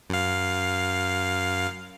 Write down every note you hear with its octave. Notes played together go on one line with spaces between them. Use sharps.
F#2 F5